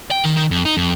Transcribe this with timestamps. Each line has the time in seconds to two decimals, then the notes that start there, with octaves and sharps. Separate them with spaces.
0.11 G5
0.24 D#3
0.37 D#3
0.51 F2
0.65 D#4
0.77 F2